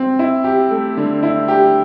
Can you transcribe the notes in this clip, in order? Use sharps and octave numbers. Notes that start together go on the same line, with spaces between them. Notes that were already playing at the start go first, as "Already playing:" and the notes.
Already playing: C4
E4
G4
A3
D3
E4
G4